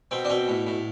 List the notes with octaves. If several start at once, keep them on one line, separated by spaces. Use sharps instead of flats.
B2 C4
D4
B2 C4
A2
A2